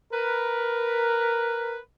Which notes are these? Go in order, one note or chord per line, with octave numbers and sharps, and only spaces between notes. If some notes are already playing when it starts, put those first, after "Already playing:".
A#4 B4